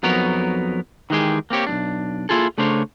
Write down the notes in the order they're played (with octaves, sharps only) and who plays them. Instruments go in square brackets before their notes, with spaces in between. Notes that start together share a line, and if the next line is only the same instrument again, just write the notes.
[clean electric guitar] F2 F#3 B3 D#4 A#4 C#5
D#3 E3 G#3 G4 G#4
A#3 C4 G4 C#5
B1 G2 D4
A#3 C4 E4 F4 G#4 A4
C#3 A3 D4 A#4 C5 C#5